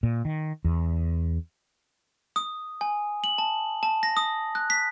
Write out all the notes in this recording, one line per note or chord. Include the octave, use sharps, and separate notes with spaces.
A#2
D#3
E2
D#6
G#5
F#7
A5
A5
A#6
D#6
F#6
B6